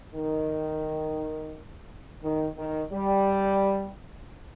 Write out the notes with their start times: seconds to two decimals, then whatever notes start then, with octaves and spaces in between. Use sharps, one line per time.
0.13 D#3
2.22 D#3
2.57 D#3
2.92 G3